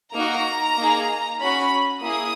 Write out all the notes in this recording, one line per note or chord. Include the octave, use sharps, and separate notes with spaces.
A#3 D#4 F#4 A#5
A#3 D#4 G#4
C#4 F#4 B5
A#3 E4 G#4 D#6